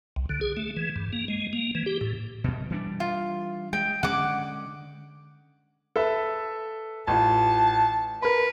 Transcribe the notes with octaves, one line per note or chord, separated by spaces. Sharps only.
C2
D3
G#4
A3
E3
G2
A#3
G#3
A#3
E3
G4
A2
F#2 B2
E3 G3 D4
F4
G#3 G5
D3 G#3 C#4 F#5 D6
A4 B4 E5
A1 F4 A5
A#4 B4 B5